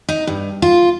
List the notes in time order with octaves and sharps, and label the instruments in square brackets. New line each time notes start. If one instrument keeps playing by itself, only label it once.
[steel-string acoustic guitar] D#4
G2
F4